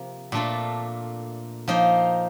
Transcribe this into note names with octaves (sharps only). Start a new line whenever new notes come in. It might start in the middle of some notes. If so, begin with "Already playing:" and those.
Already playing: C3 F3 A#3
A#2 A3 D4 F4 A4
F3 A#3 D#4